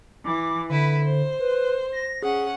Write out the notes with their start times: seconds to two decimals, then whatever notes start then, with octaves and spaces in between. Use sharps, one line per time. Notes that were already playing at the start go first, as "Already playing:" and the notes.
0.25 E3 D6
0.70 D3 E4 B4
1.05 C5
1.39 B4
1.92 A#6
2.23 C#4 G#4 F#5